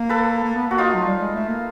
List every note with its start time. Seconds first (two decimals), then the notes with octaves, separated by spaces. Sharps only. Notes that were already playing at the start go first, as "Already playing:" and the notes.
Already playing: A#3
0.09 A4 B4
0.44 A#3
0.56 B3
0.67 A#3 F#4
0.78 D#4 F4
0.94 F#3
1.07 G3
1.20 G#3
1.35 A3
1.48 A#3